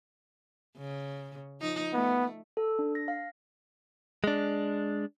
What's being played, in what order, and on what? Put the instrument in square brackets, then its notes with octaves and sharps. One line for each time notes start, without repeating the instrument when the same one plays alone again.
[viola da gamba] C#3
F3 D#4
[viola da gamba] A3 [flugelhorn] B3
[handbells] A4
D4
A#6
F5
[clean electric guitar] G#3 D4